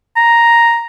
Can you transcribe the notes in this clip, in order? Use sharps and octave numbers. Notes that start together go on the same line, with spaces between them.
A#5